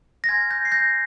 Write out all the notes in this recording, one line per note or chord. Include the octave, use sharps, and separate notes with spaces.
A#6
G#5 C6 F6 G#6
G6 A#6
C7
G6 A#6